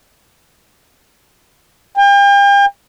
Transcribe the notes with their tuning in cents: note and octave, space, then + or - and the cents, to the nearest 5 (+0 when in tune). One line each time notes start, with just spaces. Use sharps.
G5 +40